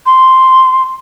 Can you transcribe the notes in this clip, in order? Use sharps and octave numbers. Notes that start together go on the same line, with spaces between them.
C6